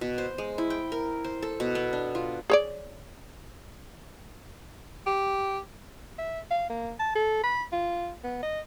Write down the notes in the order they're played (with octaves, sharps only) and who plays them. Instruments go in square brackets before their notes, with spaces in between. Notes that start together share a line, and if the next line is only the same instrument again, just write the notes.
[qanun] B2
C5
G#3
E4
G5
A#4
C5
A4
B2
B3
D4
F4
[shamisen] G#4 C#5 D5
[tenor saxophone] G4
[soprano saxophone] E5
F5
A#3
A5
A4
B5
F4
B3
D#5